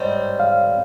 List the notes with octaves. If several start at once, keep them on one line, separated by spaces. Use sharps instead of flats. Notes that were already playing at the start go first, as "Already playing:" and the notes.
Already playing: G#2 G3 C4 C#5
F5